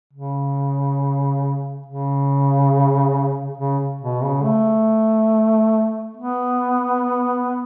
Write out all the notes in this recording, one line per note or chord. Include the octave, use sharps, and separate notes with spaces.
C#3
C#3
C#3
B2
C#3
A3
B3